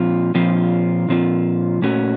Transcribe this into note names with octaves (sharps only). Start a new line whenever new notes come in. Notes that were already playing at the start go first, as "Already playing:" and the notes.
Already playing: A#2 F3 C4 F4
A#2 F3 C4 F4
A#2 F3 C4 F4
A#2 A3 C#4 F#4